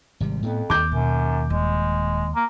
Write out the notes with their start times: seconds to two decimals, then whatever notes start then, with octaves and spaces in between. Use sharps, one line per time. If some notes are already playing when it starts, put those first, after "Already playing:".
0.20 G#1 C3 G3
0.42 F2 A2 A3 B3
0.70 D#2 D#3 D6 G6
0.92 F#2 B2
1.50 D#1 G#3
2.35 A#3